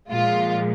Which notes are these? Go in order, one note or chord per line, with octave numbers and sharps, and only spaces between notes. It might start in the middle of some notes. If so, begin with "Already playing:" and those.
A#2 F3 G#3 F4